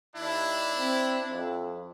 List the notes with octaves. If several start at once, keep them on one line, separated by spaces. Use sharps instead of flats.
D#2 D4 E4
C4
F2